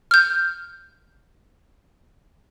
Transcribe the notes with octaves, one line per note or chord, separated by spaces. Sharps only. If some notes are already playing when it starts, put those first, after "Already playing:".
F6 G6